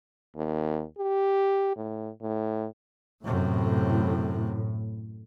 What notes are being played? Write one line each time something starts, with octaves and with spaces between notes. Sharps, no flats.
D#2
G4
A2
A2
F#2 A2 C3